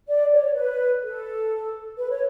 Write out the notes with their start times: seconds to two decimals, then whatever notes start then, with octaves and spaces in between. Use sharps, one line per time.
0.08 D5
0.33 C#5
0.55 B4
1.04 A4
1.98 B4
2.10 C#5